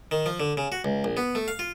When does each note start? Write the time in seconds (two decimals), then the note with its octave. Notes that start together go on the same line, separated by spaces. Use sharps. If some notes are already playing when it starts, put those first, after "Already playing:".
0.11 D#3
0.26 F3
0.40 D3
0.57 C#3
0.72 F#4
0.85 C#2
1.04 A#1
1.17 B3
1.35 A3
1.48 F5
1.59 F4